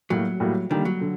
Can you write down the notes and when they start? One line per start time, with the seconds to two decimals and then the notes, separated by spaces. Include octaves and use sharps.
0.10 A2 F#3 G3 A#3 F#4
0.40 A2 G3 A#3 F#4
0.70 D3 D#3 G3 A#3
0.85 F#3
1.01 D3